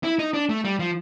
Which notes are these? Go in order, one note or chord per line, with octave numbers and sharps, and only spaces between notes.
E4
D#4
D4
A3
G3
F3